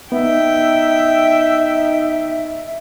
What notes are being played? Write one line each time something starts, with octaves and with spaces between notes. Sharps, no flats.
B3 D#4 E5 G5